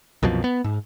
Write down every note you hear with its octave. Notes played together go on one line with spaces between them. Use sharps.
C2 F#2 B2 F3
B3
G#2